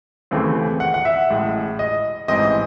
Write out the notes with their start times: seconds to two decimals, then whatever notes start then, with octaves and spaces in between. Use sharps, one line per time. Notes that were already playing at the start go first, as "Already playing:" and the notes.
0.31 D#2 C#3 E3 A3 C4
0.80 F#5
0.94 F#5
1.05 E5
1.30 A1 A2 G#3
1.79 D#5
2.28 A1 G#2 E3 C4 D#5